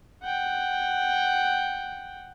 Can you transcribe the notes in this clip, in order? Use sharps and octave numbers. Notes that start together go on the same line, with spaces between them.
F#5 G5